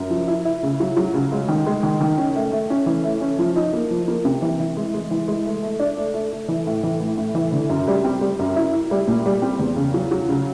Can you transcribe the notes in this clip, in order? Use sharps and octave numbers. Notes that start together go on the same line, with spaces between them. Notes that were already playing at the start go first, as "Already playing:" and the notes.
Already playing: F#2
F3
E4
E4
C#3
F#3
F#3
C#3
G#3
D#3
G#3
D#3
D#3
C#4
A3
A3
C#4
E3
A3
C#4
F3
D#4
A#3
F3
A#3
C3
E3
E3
G#3
G#3
E3
G#3
A3
A3
D4
A3
A3
A3
E3
A2
E3
A2
A2
E3
D3
F#2
G3
C4
G3
F#2
E4
E4
G3
A#2
G3
C4
E2
C#3
F#3
F#3
C#3